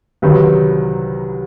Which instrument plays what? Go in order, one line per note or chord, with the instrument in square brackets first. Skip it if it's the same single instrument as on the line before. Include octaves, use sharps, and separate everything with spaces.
[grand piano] C2 C3 D#3 F#3 B4